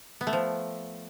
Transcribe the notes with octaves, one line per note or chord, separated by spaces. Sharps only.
B3
A3
F3